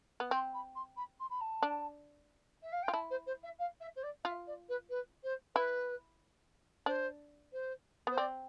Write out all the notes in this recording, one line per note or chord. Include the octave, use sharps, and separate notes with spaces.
B3
C4 C6
B5
C6
B5
C6
B5
A5
D4
E5
F5
G5
F4
E4 A5
C5
C5
E5
F5
E5
C5
D5
F4 E5
D5
B4
B4
C5
E4 B4
D4 C5
C5
B3 C5
C4 D5